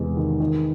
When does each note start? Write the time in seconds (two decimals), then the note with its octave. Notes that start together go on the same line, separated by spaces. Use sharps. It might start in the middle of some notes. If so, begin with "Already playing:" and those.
Already playing: E2 C3 G#3
0.17 D#3
0.40 D#3